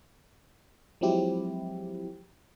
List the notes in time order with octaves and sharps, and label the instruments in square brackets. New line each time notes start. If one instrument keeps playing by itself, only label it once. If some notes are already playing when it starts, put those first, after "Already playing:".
[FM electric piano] F3 F#3 G#3 C4 E4 G4